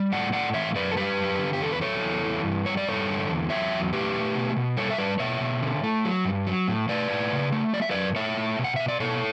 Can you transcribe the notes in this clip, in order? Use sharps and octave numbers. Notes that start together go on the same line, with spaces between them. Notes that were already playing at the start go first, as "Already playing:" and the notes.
Already playing: G3
A2 D5 F#5
A2 D5 F#5
E3 C#5 E5
F#2 B4 D5
A4
G3 G4 B4
F#2
D3
G4
E2 A4
B4
F#3 A4 C#5
E2
E3
G2
G3 C#5
D5
G2 A4 C#5
D3
E2
F#3 C#5 E5
E2
A3 G4 B4
A3
B2
B2
G3 A4 C#5
E5
G3 B4 D5
B2 C#5 E5
B2
D3
A3
F#3
G2
F#3
A2
A3 B4 D5
A2
C#3
A3
F#3 D5
E5
F#2 B4 D5
A3 C#5 E5
A3
B2
F#5
B2 E5
D5
B2 A4 C#5